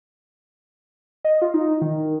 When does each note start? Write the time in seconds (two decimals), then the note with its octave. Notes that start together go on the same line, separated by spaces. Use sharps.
1.25 D#5
1.42 F4
1.54 D#4
1.82 D#3